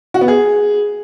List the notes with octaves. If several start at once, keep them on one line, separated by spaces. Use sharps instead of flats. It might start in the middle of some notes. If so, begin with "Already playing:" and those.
F#4
B3
G#4